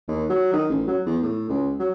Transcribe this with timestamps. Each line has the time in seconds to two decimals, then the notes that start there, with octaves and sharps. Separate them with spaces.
0.08 D#2
0.30 F#3
0.53 D#3
0.70 A1
0.88 F#3
1.06 E2
1.23 A2
1.49 C#2
1.80 F#3